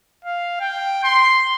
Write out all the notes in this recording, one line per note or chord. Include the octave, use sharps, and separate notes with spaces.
F5
G5
C6